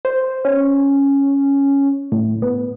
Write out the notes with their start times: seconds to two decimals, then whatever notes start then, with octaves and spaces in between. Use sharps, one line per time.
0.05 C5
0.45 C#4
2.12 A2
2.42 B3